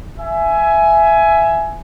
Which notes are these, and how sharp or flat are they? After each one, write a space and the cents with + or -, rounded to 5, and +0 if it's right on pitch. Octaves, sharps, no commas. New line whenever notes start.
E5 +15 G#5 +15